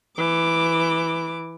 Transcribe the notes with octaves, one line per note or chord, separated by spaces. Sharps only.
E3 D6